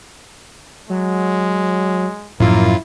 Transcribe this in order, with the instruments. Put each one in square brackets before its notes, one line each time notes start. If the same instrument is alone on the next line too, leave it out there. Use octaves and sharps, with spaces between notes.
[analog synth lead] F#3 [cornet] G#3
[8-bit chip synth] F#2 F4 [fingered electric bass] A2 F3 [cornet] A#3 [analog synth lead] E4